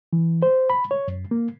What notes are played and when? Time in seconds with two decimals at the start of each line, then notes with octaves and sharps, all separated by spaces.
0.13 E3
0.43 C5
0.70 B5
0.91 C#5
1.08 F#2
1.31 A#3